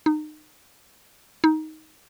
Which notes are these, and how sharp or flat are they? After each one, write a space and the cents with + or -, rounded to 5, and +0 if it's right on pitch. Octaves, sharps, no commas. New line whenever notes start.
D#4 -30
D#4 +10